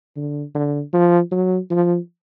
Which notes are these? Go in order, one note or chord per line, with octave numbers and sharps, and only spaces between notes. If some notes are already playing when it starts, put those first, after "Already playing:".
D3
D3
F3
F#3
F3